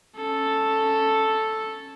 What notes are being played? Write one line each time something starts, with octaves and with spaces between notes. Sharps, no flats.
C#4 A4